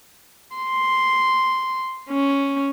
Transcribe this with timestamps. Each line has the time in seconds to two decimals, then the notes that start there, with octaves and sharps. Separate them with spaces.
0.56 C6
2.10 C#4